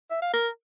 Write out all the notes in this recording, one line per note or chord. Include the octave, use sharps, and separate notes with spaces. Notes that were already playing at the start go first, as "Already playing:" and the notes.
E5
F5
A#4